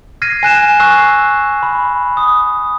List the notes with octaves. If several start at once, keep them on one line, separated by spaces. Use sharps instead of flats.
F6 G#6 A#6 C7 D#7
G#5 F#6 E7
C#6 E6 F#6 C7
B5
D#6